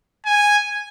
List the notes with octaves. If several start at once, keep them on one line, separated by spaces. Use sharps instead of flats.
G#5